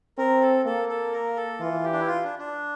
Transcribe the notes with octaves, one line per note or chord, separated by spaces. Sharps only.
C4 A#4
A4
A#3 A4
A4
A#4
A4
E3 F4
G4
D4
E4
F4
D4
D4